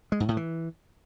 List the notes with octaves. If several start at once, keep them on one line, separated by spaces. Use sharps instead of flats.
G#3
G#2
A2
E3